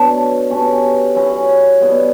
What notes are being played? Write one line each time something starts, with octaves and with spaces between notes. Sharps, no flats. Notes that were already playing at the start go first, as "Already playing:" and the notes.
Already playing: B2 F#3 A3 D4
B2 A3 C#4 G4
F#3 C#4 E4
G3 B3 E4